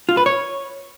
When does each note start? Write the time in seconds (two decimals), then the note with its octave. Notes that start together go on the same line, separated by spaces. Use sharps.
0.09 F4
0.17 B4
0.26 C#5